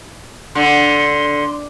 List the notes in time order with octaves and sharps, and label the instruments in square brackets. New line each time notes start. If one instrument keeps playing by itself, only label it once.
[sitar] D3 [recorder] C6